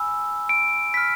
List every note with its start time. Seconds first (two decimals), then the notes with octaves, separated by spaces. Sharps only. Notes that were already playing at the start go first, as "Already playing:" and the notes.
Already playing: G#5 B5 E6
0.49 D7
0.94 B5 B6
0.97 F6